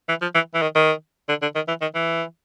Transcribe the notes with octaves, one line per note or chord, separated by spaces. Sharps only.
E3
F3
E3
E3
D#3
D#3
D3
D3
D#3
E3
D#3
E3